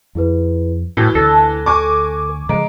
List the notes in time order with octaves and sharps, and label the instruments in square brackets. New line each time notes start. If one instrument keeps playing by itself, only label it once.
[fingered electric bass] F2 [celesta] E4 G#4 B4
[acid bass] A2 [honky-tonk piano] E3 [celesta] F#4
[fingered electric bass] D2 D3 [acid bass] A4 [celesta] F#6 A#6
[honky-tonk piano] G#5 C#6 D6
[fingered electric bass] C#3 F3 [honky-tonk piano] G#3 [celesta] A#5 D7